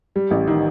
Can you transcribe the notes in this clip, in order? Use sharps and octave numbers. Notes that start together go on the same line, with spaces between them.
G3
A1
D#3